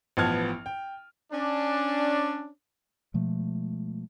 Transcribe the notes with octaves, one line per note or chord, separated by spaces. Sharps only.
A1 F3 B3 A5 F6 G#6
G5
C#4 D4
B2 F3 G#3 A3